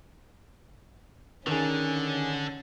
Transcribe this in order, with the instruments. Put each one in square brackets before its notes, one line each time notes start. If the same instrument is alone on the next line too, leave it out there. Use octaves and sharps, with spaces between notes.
[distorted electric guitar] D3 [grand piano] D#3 G#4 [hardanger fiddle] C#4